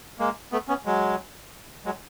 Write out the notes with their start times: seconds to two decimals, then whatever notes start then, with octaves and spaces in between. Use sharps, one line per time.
0.19 G#3 A#3
0.52 A3 B3
0.69 B3 C#4
0.85 F#3 G#3
1.85 F#3 G#3